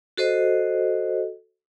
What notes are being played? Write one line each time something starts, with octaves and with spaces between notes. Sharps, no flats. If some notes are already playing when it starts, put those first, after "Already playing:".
F#4 A4 C5 D#5